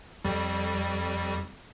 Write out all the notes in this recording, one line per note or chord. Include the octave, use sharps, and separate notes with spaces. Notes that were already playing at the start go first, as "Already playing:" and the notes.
F2 G3